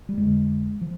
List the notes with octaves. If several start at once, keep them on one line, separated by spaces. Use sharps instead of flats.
G3
F2 D3 G#3
F3